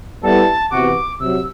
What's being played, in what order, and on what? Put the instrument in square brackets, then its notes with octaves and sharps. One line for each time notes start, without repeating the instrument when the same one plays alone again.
[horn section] G3 B3 E4 A4 [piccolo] A5
[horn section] C3 E3 B3 F#4 [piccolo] D6
[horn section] C3 F#3 [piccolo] E6